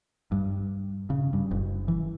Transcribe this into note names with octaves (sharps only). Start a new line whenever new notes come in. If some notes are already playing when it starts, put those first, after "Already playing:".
G2
C#3
G2
F#1
E3